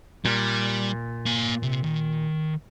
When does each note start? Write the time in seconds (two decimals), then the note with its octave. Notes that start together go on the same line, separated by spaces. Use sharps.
0.25 A#2 G3
1.26 A#3 G#5
1.63 C3
1.84 D#3